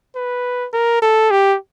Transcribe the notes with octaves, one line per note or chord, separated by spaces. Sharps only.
B4
A#4
A4
G4